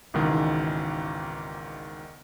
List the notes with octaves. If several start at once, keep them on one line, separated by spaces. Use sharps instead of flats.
G#1 C#2 G#2 B2 D#3 E3